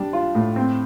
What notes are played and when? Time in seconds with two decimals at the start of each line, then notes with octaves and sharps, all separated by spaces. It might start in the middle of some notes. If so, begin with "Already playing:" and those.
Already playing: G3 D4
0.13 F4
0.35 A2
0.56 C4